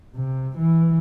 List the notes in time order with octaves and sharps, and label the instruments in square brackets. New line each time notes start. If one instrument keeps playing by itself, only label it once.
[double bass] C3
E3